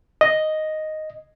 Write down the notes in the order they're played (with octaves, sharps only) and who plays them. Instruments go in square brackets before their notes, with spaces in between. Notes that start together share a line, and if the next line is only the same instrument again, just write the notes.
[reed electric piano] D#5